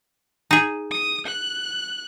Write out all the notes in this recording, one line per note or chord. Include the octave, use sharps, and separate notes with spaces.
D#4 G#4
D#6
F#6